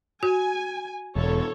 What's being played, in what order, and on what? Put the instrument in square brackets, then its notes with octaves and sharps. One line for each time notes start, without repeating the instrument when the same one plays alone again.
[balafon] F#4 [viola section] G#5
[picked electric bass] E1 [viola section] A4 C#5